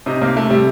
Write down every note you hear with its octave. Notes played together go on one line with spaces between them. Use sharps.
C3 D#4
C3 A#3
C3 A3
C3 G3